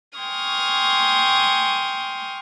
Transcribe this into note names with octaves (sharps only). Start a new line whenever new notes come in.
G5 G#5 C6 C#6 D#6 F6